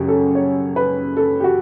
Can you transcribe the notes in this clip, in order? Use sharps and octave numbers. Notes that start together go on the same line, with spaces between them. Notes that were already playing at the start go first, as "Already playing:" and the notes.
Already playing: F#2 C#3 F#3 F#4 G4
A4
C#5
B4
A4
G4
F#4